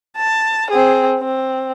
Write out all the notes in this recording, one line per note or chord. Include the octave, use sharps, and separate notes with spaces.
A5
C4 G#4
C4